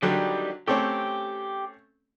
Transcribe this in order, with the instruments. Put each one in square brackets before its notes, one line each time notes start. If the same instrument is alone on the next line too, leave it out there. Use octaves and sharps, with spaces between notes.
[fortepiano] D3 F#3 [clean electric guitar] D#3 G3 G4
[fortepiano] A3 C4 C#4 [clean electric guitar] G4